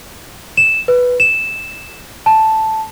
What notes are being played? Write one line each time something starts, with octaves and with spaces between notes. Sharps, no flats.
E7
B4
E7
A5